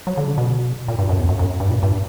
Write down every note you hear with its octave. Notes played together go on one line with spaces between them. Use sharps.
F#3
D3
C#3
B2
A#2
G2
F#2
E2
F#2
F#2
G2
A#2
G2